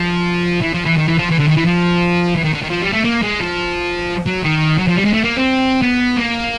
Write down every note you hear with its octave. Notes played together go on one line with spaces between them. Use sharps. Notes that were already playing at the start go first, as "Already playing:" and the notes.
Already playing: F3
E3
F3
E3
D#3
E3
F3
E3
D3
D#3
E3
F3
E3
D#3
D3
D#3
F3
G3
A3
A#3
G#3
F3
F#3
D#3
F#3
F3
G3
G#3
A3
A#3
C4
B3
A#3